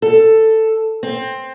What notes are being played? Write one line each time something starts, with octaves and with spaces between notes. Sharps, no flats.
A4
C4